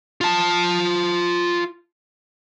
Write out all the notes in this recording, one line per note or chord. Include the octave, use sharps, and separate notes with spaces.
F4 A5